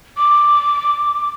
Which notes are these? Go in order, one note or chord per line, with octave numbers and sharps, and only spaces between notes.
D6